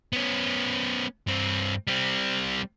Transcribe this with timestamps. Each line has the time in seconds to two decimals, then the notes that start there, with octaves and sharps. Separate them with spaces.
0.13 B3 C#4
1.27 G2 C4
1.87 G3 C4